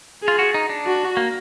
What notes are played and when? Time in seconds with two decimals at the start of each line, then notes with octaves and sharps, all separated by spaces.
0.23 G#4
0.28 F4
0.39 F#4
0.54 D#4
0.69 D4
0.86 F#4
1.17 A#3